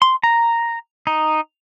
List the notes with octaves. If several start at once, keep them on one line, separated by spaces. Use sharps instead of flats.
C6
A#5
D#4